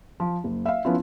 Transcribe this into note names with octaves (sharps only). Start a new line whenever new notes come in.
F3
F#1
E5 F5
F3 B3 C#4 E4 F4